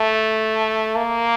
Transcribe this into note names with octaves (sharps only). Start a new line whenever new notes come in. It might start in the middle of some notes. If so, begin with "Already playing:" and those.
Already playing: A3
A#3